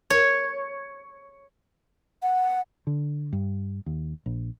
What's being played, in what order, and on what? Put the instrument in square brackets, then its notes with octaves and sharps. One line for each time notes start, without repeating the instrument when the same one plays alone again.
[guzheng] C#5
[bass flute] F#5
[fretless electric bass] D3
G2
D#2
A#1